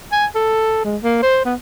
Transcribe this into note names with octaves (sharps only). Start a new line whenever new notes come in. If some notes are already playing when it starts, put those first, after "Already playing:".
G#5
A4
G#3
A#3
C5
B3